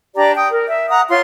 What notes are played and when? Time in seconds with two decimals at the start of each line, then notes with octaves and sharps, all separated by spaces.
0.16 D4 G4 D5 A#5
0.36 G5 D#6
0.51 A#4
0.68 E5
0.90 F#5 A#5 D#6
1.08 F4 C#5 C6